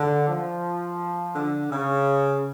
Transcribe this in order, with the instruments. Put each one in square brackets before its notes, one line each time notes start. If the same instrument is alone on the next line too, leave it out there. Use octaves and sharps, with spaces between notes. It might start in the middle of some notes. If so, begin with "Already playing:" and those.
Already playing: [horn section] D3
F3
D3
C#3